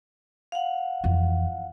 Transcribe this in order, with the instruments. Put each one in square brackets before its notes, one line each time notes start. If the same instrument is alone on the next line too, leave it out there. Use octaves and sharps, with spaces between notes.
[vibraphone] F5 F#5
[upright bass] F2 E3